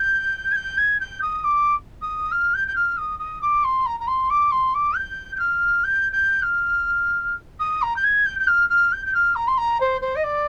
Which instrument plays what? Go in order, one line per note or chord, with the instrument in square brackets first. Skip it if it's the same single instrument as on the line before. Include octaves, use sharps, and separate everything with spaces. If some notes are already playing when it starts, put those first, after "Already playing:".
Already playing: [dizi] G6
G#6
G6
G#6
G6
D#6
D6
D#6
F6
G6
G6
F6
D#6
D#6
D6
C6
A#5
A#5
C6
D6
C6
D6
G6
G6
F6
G6
G6
F6
D#6
A#5
G6
G#6
G6
G6
F6
F6
G6
G6
F6
A#5
C6
A#5
C5
C5
D#5
D5